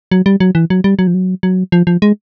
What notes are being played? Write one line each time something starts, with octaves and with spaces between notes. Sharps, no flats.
F#3
G3
F#3
E3
F#3
G3
F#3
F3
F#3
F#3
F3
F3
G#3